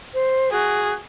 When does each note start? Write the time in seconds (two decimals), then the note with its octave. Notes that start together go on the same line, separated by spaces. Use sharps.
0.13 C5
0.52 F#4 G#4